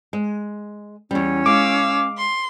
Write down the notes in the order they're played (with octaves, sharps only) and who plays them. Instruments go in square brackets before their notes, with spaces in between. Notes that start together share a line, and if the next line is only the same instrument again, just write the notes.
[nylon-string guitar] G#3
[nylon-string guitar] E2 G3 [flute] C#4
[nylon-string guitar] G#3 [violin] F5 E6 [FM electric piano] D6
[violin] C6